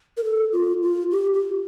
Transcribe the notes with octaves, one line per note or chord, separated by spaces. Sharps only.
A#4
A4
F4
F4
G4
G4